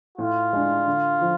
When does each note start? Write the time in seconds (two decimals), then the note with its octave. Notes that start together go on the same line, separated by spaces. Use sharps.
0.18 A2 F4
0.53 G#3 D4
0.87 D3
1.21 F3